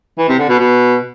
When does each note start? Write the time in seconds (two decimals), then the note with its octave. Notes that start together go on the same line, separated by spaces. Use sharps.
0.18 E3
0.29 C3
0.39 D3
0.49 B2
0.59 B2